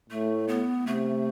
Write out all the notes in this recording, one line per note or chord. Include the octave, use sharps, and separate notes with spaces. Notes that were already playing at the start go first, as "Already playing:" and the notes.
A2 A3
B3
C3 A3